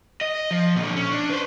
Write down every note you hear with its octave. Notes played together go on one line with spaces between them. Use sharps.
D#5
F3
A#2 D3
C#4
D4
B4 C5